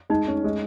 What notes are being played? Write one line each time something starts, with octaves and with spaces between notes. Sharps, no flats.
G#3 D#4
C#4
G#3